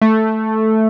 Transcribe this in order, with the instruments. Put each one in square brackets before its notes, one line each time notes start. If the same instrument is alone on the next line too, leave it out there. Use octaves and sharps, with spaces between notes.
[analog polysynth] A3